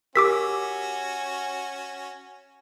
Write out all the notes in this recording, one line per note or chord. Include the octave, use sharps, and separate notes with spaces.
C#4 F#4 G4 A#4 D6 E6 B6